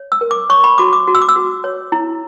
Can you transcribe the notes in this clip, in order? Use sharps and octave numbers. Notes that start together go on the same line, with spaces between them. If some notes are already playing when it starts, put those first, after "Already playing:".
Already playing: C#5
E6
A#4
D6
C#5 C#6
B5
F#4 D6
D6
F#4
E6
D6
E6
F#4
C#5
E4